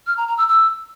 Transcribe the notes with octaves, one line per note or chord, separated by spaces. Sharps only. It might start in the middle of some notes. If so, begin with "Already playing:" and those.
F6
A#5
A#5
E6
E6